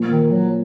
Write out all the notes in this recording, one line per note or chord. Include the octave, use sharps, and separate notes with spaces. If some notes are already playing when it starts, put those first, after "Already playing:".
Already playing: A#2 F3 A#3
D#3
F#3